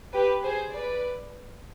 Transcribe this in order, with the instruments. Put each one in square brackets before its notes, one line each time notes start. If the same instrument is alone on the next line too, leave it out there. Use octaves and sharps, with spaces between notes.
[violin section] G4 B4
G#4 C5
B4 D5